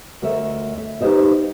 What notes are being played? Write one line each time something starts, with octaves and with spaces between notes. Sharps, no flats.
D2 A#4 C#5 D#5 E5
E5
D#4 G4 B4 C5 D#5 F5